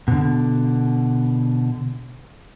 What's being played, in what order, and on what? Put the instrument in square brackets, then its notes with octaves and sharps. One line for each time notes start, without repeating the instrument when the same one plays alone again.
[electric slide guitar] B2 D3